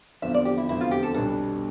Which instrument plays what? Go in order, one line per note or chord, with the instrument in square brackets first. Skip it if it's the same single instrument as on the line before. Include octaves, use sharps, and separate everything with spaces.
[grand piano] E2 D3 F3 C4 [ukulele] E5
[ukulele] D5
G4
E4
[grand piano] F1 E2 D3 F3 C4 [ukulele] E4
[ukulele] F4
G4
A4
[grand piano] B1 B2 G3 B3 D4 [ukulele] A4